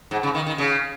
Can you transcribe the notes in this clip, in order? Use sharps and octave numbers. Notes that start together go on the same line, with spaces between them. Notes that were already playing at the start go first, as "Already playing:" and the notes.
G#2
C#3
D#3
D#3
C#3